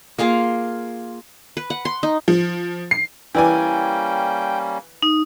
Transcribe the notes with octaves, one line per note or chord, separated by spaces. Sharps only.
A#3 F4 G#4 F5
B4
F#5
C6
D#4
F3
C7
E3 G3 A#3 C#4 D5 G5 G#5
D#4